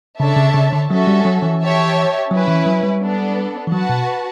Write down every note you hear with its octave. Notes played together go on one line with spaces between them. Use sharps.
C#3 D4 A4 C#5 E5 A5
C#3
C#3
D3
F#3 C#4 F#4 A4 E5
G3
F#3
E3
G4 C#5 E5 A5
F#3 C#4 E4 B4
E3
F#3
G3
B3 D4 A4
E3
F#3 F#4 B4 F#5 A5
B2